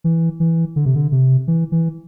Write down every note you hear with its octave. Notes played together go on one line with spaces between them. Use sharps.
E3
E3
D3
C3
D3
C3
E3
E3